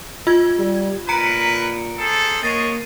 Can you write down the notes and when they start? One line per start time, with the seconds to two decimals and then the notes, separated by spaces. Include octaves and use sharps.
0.27 F4 G#6
0.59 G3
1.09 A#2 G#3 A#4 B4 A#5 C#7 D7
1.98 C4 G#4 A4
2.43 G#3 A#3 C#5 D#5 A6 C7 D#7